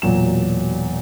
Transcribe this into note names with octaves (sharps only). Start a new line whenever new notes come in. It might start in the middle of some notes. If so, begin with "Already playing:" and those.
E1 A#2 F#3 E7